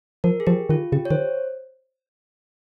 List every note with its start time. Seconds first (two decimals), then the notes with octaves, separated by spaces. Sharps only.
0.24 F3 A#4
0.40 G#4
0.47 F3 G4
0.69 D#3 F4
0.92 C#3 G4
1.05 C#5
1.11 D#3 C5